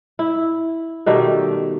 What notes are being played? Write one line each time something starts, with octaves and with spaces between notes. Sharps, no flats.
E4
B2 D#3 G3 A3